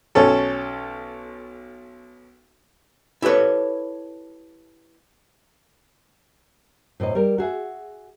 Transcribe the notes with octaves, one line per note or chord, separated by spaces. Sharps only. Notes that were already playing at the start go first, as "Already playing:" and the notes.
B1 C#4 A4
E4 G4 A4 B4 C#5
A2 C3 B4 D#5
G3 A#4 D#5
F#4 G#4 E5